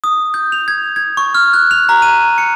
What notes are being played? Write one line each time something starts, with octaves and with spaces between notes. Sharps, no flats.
D#6
G6
F7
G#6
G#6
C#6
F6
F#6
F7
A#5
D#7
C#7